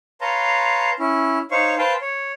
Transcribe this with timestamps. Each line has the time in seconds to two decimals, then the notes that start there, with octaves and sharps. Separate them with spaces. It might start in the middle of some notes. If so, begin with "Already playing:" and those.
0.21 B4 C#5 F5 A5 A#5 C6
0.99 C#4 E4
1.51 D#4 C5 C#5 F5 C#6
1.78 B4 C5 F5 G5 A5
2.01 C#5